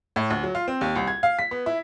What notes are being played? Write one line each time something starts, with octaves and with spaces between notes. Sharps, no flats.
A2
D2
F#3
F4
C4
D#2
C2
G#6
F5
B6
B3
E4